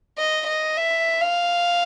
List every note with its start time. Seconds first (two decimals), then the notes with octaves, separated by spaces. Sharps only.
0.18 D#5
0.47 D#5
0.77 E5
1.21 F5